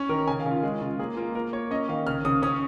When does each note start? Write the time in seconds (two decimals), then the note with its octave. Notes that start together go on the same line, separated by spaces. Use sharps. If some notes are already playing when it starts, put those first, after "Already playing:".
Already playing: C#4
0.09 D#3 A#4
0.27 C#3 G#5
0.40 F5
0.46 C#3
0.51 F4
0.63 G#3 G#4
0.81 C#3 F4
0.99 A#3 G#4
1.17 A#3 F4
1.35 A#3 A#4
1.53 A#3 C#5
1.71 C#4 D#5
1.89 D#3 F5
2.07 C#3 F6
2.25 C#3 D#6
2.42 C#4 D#6